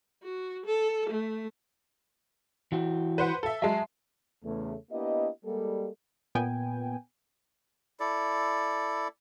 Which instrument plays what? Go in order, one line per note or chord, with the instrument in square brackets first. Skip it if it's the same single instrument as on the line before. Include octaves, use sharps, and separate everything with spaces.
[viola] F#4
A4
A3
[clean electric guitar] E3 F#4 G4
[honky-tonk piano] B4 C5 F#5
A4 E5
[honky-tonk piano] F#3 G#3 [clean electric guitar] E5 A5
[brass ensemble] E2 C#3 A3
A#3 B3 D4 E4 G4 D#5
G3 G#3 A#3 A4
[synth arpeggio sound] A#2 B3 G5 G#5
[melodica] E4 A4 D5